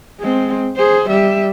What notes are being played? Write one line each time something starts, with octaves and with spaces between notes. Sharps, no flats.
G#3 C4
G#4 C5
G3 E5